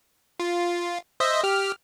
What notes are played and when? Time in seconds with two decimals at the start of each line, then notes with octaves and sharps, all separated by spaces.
0.40 F4
1.20 C5 D#5 E5
1.44 G4 F6